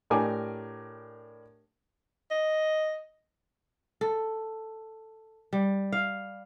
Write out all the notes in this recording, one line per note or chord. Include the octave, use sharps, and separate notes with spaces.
A2 D4 G4 A#4 G#5 D6
D#5
A4
G3
F5